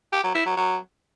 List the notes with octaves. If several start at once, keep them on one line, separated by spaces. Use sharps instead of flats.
G4
F#3
E4
F#3
F#3